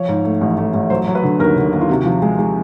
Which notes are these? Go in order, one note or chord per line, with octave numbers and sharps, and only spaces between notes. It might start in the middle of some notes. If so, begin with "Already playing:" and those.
Already playing: F3 C#5
G#2
A3
A1
A3
A1
F#3 C5
F#3
B4
D3
D#2 A#4
D3
D#2
F4
C3 F#4
F3
G#3
G#3